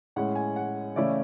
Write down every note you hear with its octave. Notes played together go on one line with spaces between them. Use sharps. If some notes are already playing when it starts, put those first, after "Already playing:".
A2 G#3 C#4 F#5
G#5
F#5
C#3 E3 A3 C#4 E4 D5